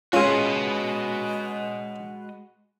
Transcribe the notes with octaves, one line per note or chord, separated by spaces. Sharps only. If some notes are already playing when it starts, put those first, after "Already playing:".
G#3 C#4 F4 F#4 G#4 B4 D#5